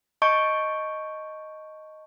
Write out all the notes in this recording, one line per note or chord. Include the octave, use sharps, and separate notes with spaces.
D#5 A5 C#6 G6 D7